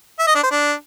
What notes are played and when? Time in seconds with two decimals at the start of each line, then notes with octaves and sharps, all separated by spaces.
0.19 E5
0.27 D#5
0.35 D4
0.43 C5
0.51 D4